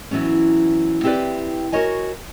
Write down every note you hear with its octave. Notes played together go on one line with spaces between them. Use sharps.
E3 F#3 B3 C#4
C4 E4 G4 A4 B4 D5
F#4 G4 A#4 C#5 D#5 G#5